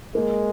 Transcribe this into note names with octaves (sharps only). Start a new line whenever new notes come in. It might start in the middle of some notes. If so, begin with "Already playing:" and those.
G#3 A#3